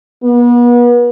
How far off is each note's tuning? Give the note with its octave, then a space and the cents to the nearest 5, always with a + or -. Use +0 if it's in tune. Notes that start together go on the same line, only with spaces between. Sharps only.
B3 -40